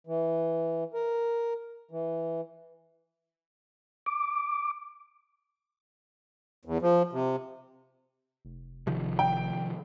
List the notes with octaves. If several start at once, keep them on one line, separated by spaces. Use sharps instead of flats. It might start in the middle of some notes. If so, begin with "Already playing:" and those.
E3
A#4
E3
D6
E2
F3
C3
F1
C3 D#3 F3
G5